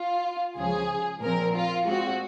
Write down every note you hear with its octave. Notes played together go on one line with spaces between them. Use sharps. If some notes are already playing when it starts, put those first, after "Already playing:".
Already playing: F4
C#2 C#3 F3 G#4
A#2 F3 C4 A#4
F4
A#2 G#3 C4 F#4